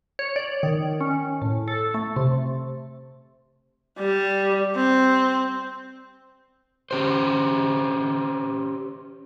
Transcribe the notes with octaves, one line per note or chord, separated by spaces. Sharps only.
C#5
D5
D#3
C#4
A2
A4
A3
C3
G3
C4
C#4 G4 C5